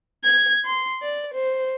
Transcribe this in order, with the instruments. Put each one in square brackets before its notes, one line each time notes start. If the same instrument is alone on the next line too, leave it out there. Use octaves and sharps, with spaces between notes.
[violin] G#6
C6
D5
C5